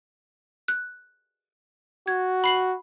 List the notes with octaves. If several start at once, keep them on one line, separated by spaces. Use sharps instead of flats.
F#6
F#4 G#6
B5 C7 F#7